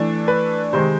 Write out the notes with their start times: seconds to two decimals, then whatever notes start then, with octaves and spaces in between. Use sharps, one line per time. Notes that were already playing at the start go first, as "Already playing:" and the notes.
Already playing: E3 A3 D4
0.28 B4
0.73 C3 D#3 G#3 C5